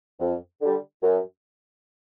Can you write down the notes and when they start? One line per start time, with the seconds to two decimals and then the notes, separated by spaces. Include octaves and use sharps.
0.19 F2
0.61 D3 G3
1.02 F#2